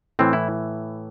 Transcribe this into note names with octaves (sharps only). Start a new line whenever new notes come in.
A2 E3 C4
E4